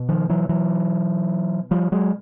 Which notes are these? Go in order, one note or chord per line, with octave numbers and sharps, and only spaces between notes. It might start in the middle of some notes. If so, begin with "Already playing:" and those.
Already playing: B2
D#3 F3
E3 F#3
E3 F#3
F3 G3
F#3 G#3